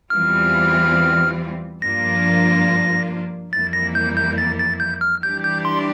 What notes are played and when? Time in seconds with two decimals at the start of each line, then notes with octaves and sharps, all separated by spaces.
0.10 E2 E3 G3 C4 F4 F6
1.81 G2 F3 A#3 D4 F4 A#6
3.52 F2 E3 G3 A#3 E4 A6
3.73 A#6
3.95 G6
4.17 G6
4.38 A6
4.59 A6
4.80 G6
5.01 F6
5.23 E3 G3 D4 G4 G6
5.44 G6
5.65 C6